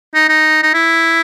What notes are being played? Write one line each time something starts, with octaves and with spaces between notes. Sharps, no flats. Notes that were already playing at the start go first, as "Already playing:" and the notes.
D#4
D#4
D#4
E4